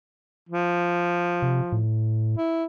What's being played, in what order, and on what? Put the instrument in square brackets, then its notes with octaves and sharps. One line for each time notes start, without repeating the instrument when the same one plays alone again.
[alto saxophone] F3
[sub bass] C3
A2
[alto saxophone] E4